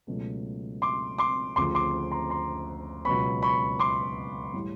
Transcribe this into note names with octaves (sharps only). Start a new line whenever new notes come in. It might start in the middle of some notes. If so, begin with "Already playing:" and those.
C#2 B2 F#3 A3
C6 D6
C6 D6
D2 C#3 F3 C6 D6
C6 D6
A#5 C6
A#5 C6
C#2 B2 F#3 B3 B5 C#6
B5 C#6
C6 D6
A2 E3 G3